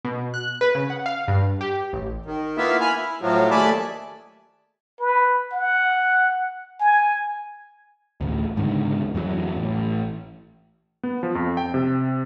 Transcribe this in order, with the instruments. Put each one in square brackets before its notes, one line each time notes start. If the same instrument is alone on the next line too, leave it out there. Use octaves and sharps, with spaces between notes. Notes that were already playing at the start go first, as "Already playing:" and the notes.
[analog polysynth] B2
F#6
B4
C#3
F#5
F5
G2
G4
A1
[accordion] D#3
A#3 B3 E4 F4 E5
G#5 B5 F6
E4
A2 F3 F#3
D#2 A3 G#4 D5 A5 B5
[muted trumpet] B4
F#5
G#5
[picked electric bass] A1 D2
C#2 G#2 D3 D#3
F2 E3 F#3
A1
[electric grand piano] B3
F3
F2
G5
C3